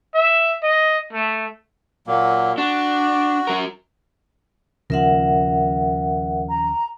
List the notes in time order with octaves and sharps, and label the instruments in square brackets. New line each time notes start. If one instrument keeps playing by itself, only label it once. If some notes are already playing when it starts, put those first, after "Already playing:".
[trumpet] E5
D#5
A3
[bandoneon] A#2 F#3 A#3
[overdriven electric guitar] D4 [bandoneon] F#4
[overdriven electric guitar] F#3 A#4
[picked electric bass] D#2 C#3 F3 [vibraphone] A#4 E5 F#5
[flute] A#5